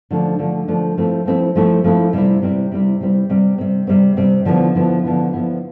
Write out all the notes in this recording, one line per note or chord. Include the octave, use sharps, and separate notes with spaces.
D3 F3 A3 D4
D3 F3 A3 D4
D3 F3 A3 D4
F3 A3 C4 E4
F3 A3 C4 E4
F3 A3 C4 E4
F3 A3 C4 E4
C3 G3 C4 E4
C3 G3 C4 E4
C3 G3 C4 E4
C3 G3 C4 E4
C3 G3 C4
C3 G3 C4
C3 G3 C4
C3 G3 C4
D3 F3 B3 E4
D3 F3 B3 E4
D3 F3 B3 E4
D3 F3 B3 E4